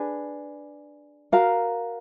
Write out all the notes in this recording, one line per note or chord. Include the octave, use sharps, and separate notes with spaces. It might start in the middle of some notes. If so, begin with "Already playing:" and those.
Already playing: D4 G#4 B4
F#4 A#4 F5 A#5